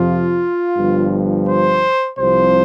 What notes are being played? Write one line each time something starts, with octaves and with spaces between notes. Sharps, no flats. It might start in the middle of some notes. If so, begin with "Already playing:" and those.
Already playing: F2 C3 F3 F4
G1 G2 F3
C5
C2 C3 F3 C5